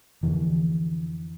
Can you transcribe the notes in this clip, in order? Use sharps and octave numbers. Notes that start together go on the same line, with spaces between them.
F2 D3 E3